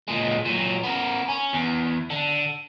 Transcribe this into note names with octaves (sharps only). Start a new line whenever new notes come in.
A#2 G#3
A#2 F#3
B3 A#4
C#4
E2
D3